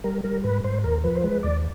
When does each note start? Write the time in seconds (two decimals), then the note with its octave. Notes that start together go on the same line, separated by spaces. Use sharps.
0.04 G3 A#4
0.24 G3 A#4
0.44 G#2 B4
0.64 G#2 C5
0.84 D#2 A#4
1.04 F3 B4
1.15 C5
1.24 G#3 B4
1.43 D#2 D5